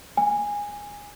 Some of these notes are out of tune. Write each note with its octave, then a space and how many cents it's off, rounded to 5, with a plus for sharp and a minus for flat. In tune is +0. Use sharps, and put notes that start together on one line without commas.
G#5 -15